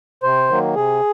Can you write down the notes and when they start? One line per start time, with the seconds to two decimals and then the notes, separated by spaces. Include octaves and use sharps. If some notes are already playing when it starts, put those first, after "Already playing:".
0.23 C3 C5
0.49 D#3 F#3 A#3
0.75 C3 G#4